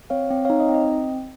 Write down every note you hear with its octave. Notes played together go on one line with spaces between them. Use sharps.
C4 C#5 F5
C4
D#4 C#5 F5
D#5
C4
D#5